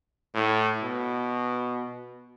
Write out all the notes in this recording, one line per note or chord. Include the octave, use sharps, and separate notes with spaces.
A2
B2